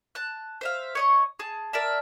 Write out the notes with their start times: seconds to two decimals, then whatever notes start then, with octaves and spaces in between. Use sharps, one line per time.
0.15 A5 F#6
0.61 C5 E5 F5
0.95 C#5 D#5 C#6
1.39 G#4 A5
1.73 A#4 D5 E5 A5